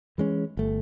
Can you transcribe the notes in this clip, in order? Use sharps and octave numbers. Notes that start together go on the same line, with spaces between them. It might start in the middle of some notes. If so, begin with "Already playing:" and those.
E3 G#3 C#4
G1 A3